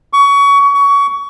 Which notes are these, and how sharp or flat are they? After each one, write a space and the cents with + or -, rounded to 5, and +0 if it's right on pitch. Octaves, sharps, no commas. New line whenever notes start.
C#6 +25
C#6 +25